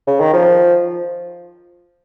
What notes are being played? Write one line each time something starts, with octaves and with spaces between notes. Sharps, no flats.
C#3
D#3
F3